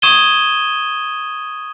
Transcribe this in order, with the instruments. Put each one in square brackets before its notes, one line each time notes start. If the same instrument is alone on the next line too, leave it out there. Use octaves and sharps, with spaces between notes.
[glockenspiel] C#6 D#6 G#6 D#7 E7 G7